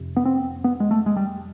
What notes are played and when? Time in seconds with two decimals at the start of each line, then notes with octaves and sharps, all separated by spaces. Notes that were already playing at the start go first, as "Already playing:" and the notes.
Already playing: F2 C3
0.16 B3
0.25 C4
0.64 B3
0.80 G#3
0.91 A3
1.06 G#3
1.16 G3